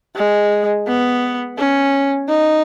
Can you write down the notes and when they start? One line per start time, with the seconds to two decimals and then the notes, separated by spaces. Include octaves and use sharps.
0.16 G#3
0.87 B3
1.58 C#4
2.29 D#4